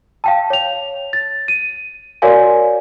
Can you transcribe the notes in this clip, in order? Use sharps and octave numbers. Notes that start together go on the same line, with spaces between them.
F5 G5 A5
C#5 F7
A6
D#7
F#4 A#4 C#5 D5 F5 G#5